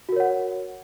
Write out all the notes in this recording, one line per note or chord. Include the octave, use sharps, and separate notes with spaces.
F#4 A#4 C#5 F#5